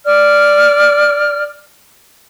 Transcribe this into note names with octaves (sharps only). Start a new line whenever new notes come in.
D5 F6